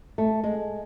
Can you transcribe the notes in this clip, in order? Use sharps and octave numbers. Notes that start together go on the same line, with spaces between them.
A3
G#3